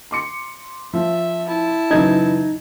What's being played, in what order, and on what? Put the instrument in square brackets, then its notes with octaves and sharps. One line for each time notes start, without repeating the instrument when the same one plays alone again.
[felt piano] C6 D6 C#7
[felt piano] F3 [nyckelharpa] E5
[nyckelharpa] E4 A5
[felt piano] F#1 E3 F#3 [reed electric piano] D#4 G#6